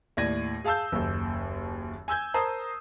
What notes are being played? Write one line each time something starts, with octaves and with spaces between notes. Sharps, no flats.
D#2 A2 D5 G#6 A#6 D#7
G#4 F5 A5 E6 G6
F#1 D#2
G#5 E6 G6 G#6
A#4 C5 A5 A#5 D#6